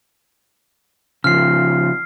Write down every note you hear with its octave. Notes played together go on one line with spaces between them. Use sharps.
C#3 F3 F6 C7